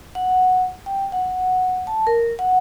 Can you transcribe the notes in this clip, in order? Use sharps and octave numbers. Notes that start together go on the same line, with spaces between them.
F#5
G5
F#5
A5
A#4
F#5